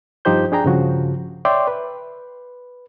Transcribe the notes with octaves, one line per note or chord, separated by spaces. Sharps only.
G2 F3 D#4 G4 C5 G6
D4 G#4 G5 A#5
G2 C#3 F3 F#4
C#5 D5 E5 G5 C6 D6
B4